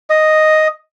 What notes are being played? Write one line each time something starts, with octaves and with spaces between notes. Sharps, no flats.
D#5